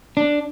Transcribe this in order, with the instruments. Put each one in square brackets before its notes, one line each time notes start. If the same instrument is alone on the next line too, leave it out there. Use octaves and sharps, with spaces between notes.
[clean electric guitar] D4